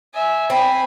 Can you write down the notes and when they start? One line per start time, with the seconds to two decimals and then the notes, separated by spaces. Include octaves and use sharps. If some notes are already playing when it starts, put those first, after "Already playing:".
0.14 E5 G#5
0.50 C4 G#5 B5